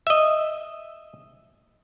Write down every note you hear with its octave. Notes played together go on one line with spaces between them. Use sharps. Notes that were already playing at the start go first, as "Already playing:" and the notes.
D#5 E5